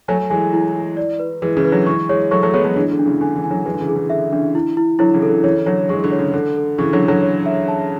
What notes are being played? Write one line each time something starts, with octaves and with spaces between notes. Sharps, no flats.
F#3 A3 G#5
E3 G#3 G#5
E4
E4
D5
B4
E3 G#3 B4
C#3 E3
B4
D3 F#3
E3 G#3 C#6
E3 G#3 C#5
F#3 A3 C#6
F#3 A3
G#3 B3 C#5
F#3 A3
E3 G#3 D4
D3
D4
C#3 E3
D3 G#5
C#3 E3
G#5
D3 F#3
E3 G#3 B4
D3
C#3 E3
G#4
C#3 E3
D3 E5
C#3 E3 D4
E4
E4
D3 F#3 E4
C#3 E3
A4
D3
C#3 E3 C#5
D3 F#3 C#5
E3 G#3 C#6
D3
C#5
C#3
D3 A4
A4
C#3 E3 C#6
D3 F#3
A4
D3 F#3
C#5
E5
A5